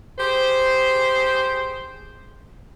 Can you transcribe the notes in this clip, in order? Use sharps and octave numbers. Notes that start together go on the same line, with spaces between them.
G4 G#4 C5